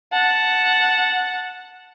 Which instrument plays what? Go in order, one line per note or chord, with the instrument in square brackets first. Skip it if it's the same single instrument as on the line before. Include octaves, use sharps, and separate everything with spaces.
[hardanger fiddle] F#5 A5